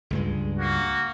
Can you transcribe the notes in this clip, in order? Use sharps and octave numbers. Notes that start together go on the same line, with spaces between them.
C#2 G2 G#3
A#3 F#4